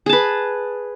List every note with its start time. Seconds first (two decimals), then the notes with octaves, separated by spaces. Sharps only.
0.06 G#4
0.09 A5
0.13 B4